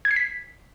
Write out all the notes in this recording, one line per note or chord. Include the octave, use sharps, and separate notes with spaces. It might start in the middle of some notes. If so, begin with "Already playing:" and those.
G#6
C7
B6